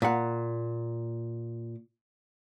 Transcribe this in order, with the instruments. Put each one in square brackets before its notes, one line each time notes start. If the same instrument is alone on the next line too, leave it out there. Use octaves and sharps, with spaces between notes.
[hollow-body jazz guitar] A#2 F#5